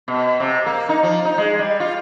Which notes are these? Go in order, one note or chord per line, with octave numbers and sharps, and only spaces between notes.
B2
C3
A#3
D#4
F3
D#4
G#3
G3
F4